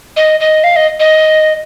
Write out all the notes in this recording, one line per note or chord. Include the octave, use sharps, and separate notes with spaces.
D#5
D#5
F5
D#5
D#5